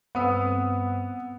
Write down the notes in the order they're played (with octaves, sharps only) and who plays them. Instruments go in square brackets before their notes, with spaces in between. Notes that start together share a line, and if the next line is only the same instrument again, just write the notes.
[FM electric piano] G2 C4 [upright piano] B3 [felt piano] F#5 D#6 E6